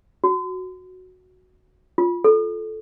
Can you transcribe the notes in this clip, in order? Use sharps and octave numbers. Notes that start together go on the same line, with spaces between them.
F#4
F4
A4